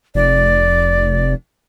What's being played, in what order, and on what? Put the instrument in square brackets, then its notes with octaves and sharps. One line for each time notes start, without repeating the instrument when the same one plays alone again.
[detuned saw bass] F1 [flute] D5